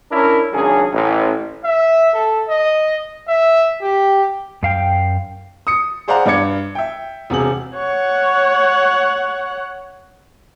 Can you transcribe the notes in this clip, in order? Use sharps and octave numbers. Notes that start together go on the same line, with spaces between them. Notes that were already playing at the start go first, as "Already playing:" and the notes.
C#4 D4 E4 A#4
G#1 C#3 F#3 C#4 D4 G#4
A1
E5
A4
D#5
E5
G4
F#2 F5 G5
D#6 C#7
G#4 C5 D5 F5 F#5 A#5
G2 D4 D6 G#6 C#7
E5 G5
E1 C3 G#4 F#7
C#5 F#5